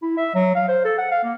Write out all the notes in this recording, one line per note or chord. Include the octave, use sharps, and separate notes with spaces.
E4
E5
F#3
F5
C5
A4
F#5
F5
A#3